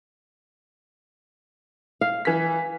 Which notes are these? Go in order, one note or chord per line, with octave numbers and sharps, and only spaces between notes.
F5
E3 B6